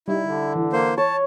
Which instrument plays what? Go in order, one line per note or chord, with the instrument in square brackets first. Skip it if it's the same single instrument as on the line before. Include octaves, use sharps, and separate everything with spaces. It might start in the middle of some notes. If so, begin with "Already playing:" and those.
[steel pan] G3 D#4 [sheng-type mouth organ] E4
[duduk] D3
[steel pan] E3
[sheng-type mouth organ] A#3 C5
[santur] C#5 [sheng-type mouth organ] A5